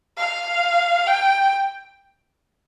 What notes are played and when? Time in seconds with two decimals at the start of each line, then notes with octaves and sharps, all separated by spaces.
0.18 F5
1.07 G5